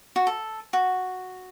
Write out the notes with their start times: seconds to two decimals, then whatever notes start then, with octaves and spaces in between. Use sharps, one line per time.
0.16 F#4
0.27 A4
0.73 F#4